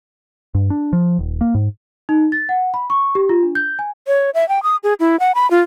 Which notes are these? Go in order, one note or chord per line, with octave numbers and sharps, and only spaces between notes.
G2
D4
F3
D#1
A#3
G#2
D#4
A6
F#5
B5
C#6
G4
F4
D4
G6
G#5
C#5
E5
G5
D#6
G#4
E4
F#5
B5
F4